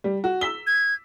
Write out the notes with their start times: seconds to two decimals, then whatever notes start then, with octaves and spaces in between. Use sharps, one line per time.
0.04 G3
0.24 F#4
0.41 E6 B6 G7
0.67 G#6